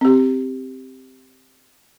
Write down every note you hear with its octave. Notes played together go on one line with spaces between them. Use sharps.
C4 G4